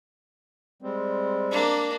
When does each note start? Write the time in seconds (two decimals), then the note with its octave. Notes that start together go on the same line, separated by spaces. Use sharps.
0.82 G3 G#3 C4
1.51 A#3 D4